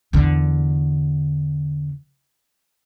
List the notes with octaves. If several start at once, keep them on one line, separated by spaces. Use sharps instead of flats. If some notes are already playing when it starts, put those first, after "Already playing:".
E2 D3